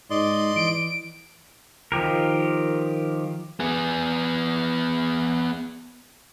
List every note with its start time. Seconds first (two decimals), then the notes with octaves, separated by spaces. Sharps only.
0.11 G#2 D5 D#5 C6
0.56 E3 D7
1.92 D#3 F3 G4 A#4
3.60 B3 G#4